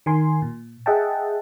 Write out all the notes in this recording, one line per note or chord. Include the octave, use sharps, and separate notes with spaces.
D#3 A#4 G#5 C6
A#2
G#4 D#5 E5 F#5 G5 A5